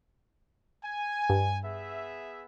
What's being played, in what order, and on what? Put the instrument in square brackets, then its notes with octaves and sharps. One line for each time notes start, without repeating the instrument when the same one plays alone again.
[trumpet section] G#5
[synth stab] G2
[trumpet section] B3 G#4 E5